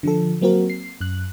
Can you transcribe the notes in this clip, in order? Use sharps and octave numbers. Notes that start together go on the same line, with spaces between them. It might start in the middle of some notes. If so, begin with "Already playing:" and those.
D3 F3 A4
F#3 A#3 C4 F#4 A#4
C7
F#2 F#6